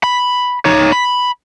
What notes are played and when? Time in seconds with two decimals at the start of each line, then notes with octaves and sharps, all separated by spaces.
0.04 B5
0.65 D#4 C#5
0.92 B5